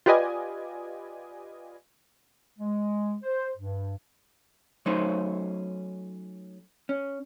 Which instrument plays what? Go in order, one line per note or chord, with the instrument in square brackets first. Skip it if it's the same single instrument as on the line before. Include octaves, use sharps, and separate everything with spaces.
[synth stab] F4 G4 B4 D5 D#5 G#5
[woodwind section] G#3
C5
G2
[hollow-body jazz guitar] F#3 A3 C#4 D#4 C5
C#4